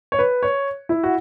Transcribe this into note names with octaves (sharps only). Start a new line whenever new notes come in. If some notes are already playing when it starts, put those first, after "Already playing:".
C#5
B4
C#5
E4
F#4